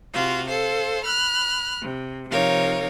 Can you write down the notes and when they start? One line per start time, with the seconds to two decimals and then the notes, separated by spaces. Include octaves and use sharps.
0.13 C3 F4 F#4 F5
0.48 A4 C5 F5
1.03 B5 F6 F#6
1.81 C3
2.29 C3 F3 D#4 A#4 C#5 F5